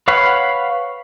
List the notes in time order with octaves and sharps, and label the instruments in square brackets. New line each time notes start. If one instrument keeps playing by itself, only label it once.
[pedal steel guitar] B4 C#5 F5 F#5 B5